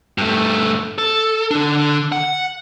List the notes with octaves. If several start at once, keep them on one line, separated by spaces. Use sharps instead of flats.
G2 A3
A4
D3 D4
F#5